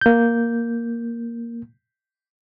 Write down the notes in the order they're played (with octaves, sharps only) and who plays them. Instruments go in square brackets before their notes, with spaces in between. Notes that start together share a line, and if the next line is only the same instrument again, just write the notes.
[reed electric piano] A#3 G6